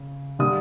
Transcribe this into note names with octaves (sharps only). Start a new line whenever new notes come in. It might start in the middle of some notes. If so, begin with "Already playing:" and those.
Already playing: C#3
D3 G3 A#3 D#6